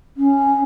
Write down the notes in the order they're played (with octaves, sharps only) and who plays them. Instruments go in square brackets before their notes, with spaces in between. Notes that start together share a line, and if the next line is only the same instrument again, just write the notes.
[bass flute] C#4